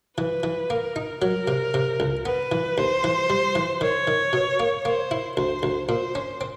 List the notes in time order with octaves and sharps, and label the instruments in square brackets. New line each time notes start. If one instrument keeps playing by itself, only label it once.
[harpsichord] E3 [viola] B4
[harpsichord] E3
[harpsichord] A#3 [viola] A#4
[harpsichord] D#4
[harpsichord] F#3 [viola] A#4
[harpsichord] C3
C3
C#2
[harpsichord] B3 [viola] B4
[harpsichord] E3
[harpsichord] D#2 [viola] C5
[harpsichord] E3
G3
E3
[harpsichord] D#3 [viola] C#5
[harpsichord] D#3
B2
A#3
[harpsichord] A#3 [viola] C5
[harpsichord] E4
[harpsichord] D2 [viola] C5
[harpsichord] D2
[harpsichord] A#2 [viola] C5
[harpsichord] C#4
C4